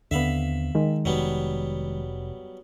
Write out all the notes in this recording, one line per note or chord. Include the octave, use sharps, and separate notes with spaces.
D#2 D3 B3 C4 E5 F5 B5
D#3 G#3
F1 F#3 G3 B3